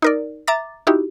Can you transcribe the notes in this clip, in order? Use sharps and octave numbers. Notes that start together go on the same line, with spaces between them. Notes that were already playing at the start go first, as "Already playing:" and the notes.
D#4 A#4 D5
E5 A#5 D6 A6
D#4 E4 F#4 G4